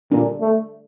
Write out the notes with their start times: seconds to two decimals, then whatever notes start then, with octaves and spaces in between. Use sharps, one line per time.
0.11 A#2 D4
0.41 A3